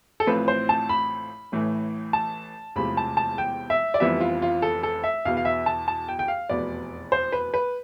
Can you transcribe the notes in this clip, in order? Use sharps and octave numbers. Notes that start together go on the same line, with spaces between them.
A4
A1 A2 F3 C4 B4
C5
A5
B5
A1 A2 E3 A3
A5
E1 E2 C3 F3 A3 B5
A5
A5
G5
E5
D5
F1 F2 E3 G3 B3 E5
F4
F4
A4
A4
E5
E2 B2 B3 F5
F5
E5
A5
A5
G5
G5
F5
F1 E2 B2 B3 D5
C5
B4
B4